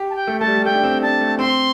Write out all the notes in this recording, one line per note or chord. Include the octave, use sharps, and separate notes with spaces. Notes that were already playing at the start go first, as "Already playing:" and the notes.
Already playing: G4
A5
G5
A3
A3 A5
G3
G3
A3 G5
D4
C4
D4 A5
A3
C4 C6